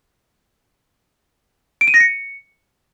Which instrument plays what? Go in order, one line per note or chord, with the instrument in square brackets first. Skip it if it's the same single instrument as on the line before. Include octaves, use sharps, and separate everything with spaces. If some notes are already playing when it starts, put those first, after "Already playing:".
[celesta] D7
D#7
A#6
C#7